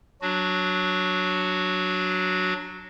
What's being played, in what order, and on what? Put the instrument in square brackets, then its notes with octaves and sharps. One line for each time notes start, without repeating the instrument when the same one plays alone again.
[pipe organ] F#3 D4 F#4